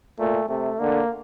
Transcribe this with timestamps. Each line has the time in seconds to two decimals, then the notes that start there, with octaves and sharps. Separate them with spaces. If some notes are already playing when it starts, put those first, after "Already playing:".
0.19 A#2 A3
0.49 C3 A3
0.79 D3 A#3